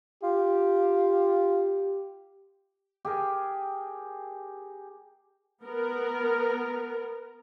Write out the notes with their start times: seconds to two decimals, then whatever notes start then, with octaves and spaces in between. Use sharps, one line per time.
0.23 F4 G4
3.05 G4 G#4 A#4
5.65 B3 A#4